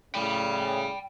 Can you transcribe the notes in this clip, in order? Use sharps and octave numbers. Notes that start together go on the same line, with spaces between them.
A2 C#3 G5 B5